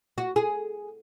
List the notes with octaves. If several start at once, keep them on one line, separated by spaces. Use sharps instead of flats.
F#4
G#4